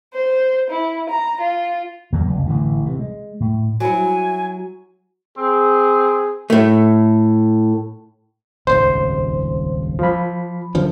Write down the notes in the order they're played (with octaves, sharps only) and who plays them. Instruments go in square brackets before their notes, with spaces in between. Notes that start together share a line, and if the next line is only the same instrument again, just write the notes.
[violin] C5
E4
A#5
F4
[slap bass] G#1 E2 F#3 A#3
F1 C#2
A1 A2 D3 E3
C3 E3
G#3
A2
[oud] F#3 E4 [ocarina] G#5
[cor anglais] C4 [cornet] G#4
[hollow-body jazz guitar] A2 A3
[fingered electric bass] D#1 G#1 C#2 [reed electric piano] C5
[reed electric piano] F3 B5
[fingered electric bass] F#2 D3 F3